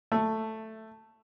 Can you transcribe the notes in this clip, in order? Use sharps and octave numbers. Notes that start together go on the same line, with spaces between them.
A3